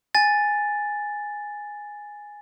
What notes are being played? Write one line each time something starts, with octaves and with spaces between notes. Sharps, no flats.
G#5 A6